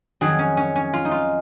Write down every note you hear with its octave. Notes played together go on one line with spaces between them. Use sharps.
F2 D#3 F#3 G#4
C#4
C#4
C#4
F4
D#4
F4